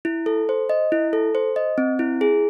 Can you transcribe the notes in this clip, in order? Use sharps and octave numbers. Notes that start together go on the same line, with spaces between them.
E4
A4
C5
D#5
E4
A4
C5
D#5
C4
E4
G#4